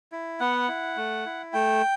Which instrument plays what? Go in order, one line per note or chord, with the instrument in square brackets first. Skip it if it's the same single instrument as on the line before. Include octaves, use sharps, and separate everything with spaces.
[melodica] E4
B3 F#5
E4
A3
E4
A3 G5